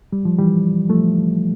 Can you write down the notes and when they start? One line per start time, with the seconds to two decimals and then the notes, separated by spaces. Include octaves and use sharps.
0.13 G3
0.25 F3
0.39 E3 G3
0.90 F3 A3